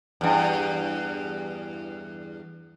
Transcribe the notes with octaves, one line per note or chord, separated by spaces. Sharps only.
E2 G2